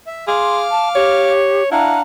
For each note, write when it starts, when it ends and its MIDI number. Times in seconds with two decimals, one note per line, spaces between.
0.07 0.25 76
0.27 0.69 68
0.27 1.32 77
0.27 0.57 84
0.27 1.32 86
0.27 1.32 89
0.71 0.89 81
0.95 1.63 67
0.95 1.69 73
1.72 2.01 62
1.72 1.96 64
1.72 2.01 77
1.72 2.01 78
1.72 2.01 82